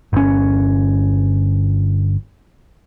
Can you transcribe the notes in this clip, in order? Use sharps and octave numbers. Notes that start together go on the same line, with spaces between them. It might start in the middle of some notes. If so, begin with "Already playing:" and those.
G1 C#4